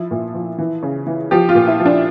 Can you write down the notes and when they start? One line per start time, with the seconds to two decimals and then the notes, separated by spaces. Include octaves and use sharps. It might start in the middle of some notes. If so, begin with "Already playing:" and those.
Already playing: F3 E4
0.11 A#2
0.34 F3
0.58 E3
0.83 C#3
1.07 E3
1.31 F3 G4
1.49 F4
1.55 A#2
1.68 E4
1.80 F3
1.85 D4